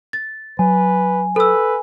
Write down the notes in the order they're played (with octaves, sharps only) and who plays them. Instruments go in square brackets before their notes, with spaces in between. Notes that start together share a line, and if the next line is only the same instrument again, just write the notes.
[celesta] A6
[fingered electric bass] F#3 [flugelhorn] B4 [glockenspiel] G#5
[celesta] A4 E6 [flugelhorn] B4